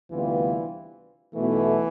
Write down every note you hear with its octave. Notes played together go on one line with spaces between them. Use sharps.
D2 C3 E3 G3 B3 F4
B1 B2 E3 A3